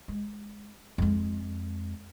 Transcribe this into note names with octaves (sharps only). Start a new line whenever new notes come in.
G#3
F2 G#3